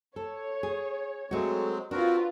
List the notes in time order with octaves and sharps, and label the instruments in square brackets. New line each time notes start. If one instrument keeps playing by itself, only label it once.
[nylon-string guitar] A4 [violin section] C#5
[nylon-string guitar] G#4
[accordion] F#3 G#3 C4 [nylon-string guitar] A3 F#4
[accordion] C4 F#4 A#4 [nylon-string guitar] D4 [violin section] F4 B4